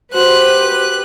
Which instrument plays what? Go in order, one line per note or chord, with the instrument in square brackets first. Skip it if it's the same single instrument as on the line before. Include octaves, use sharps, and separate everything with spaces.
[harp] F#4 [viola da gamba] G4 B4 [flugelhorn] C5 [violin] F#6